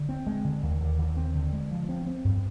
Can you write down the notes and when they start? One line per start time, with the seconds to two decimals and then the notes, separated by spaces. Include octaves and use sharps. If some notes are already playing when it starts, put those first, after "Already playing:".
Already playing: D3
0.09 C4
0.27 G#3
0.45 D3
0.63 D#2
0.81 D3
0.99 D#2
1.17 C4
1.34 D3
1.53 G#3
1.71 F3
1.89 C4
2.06 C4
2.25 G2